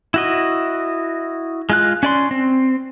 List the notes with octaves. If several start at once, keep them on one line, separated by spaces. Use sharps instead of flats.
E4 F#4 D#5
G#3 F4 F#6
C#4 D5 C6
C4